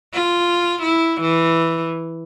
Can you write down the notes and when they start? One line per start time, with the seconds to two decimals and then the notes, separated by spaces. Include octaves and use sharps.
0.14 F4
0.82 E4
1.21 E3